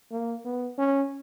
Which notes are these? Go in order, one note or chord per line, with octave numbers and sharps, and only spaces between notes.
A#3
B3
C#4